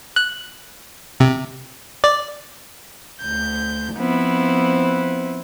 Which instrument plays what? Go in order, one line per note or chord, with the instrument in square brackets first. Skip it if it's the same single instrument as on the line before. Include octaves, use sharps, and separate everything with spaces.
[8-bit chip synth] F#6
C3
D5
[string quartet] D2 G6
F3 B3 C4 E4